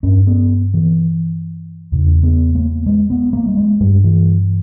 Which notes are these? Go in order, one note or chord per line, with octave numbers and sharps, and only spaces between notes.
G2 C#4
B3
E3
E2 C#3
B3
A#3
G#3
B3
A#3
G3
G#3
G2 G3
E3